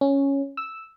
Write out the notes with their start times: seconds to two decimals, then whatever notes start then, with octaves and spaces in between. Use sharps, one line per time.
0.01 C#4
0.57 E6